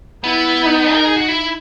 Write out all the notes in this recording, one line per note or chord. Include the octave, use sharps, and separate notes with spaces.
B3 E4
D#4
A#4
G#4
F#4
E4